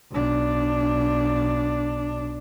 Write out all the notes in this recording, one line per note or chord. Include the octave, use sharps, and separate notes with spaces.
B1 D4